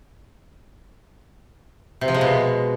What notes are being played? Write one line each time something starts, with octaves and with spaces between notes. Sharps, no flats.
C3
F3
G#3
B2